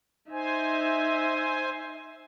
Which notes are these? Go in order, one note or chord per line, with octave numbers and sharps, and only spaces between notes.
D#4 C5 E5 G#5